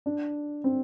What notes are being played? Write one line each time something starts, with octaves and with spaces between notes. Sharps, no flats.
D4
C4